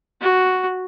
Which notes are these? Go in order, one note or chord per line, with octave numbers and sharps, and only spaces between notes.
F#4